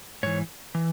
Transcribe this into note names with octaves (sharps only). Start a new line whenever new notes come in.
G#2 E3 C#5
E3